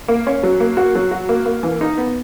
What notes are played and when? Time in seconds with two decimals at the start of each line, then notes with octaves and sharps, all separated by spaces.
0.08 A#3
0.27 C#4
0.43 F#3
0.60 A#3
0.77 F#4
0.95 F#3
1.11 F#4
1.29 A#3
1.46 A#3
1.63 E3
1.81 D#4
1.97 B3